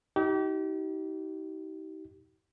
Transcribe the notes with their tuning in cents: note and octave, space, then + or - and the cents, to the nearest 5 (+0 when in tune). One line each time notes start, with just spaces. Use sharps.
D#4 +35 G4 -35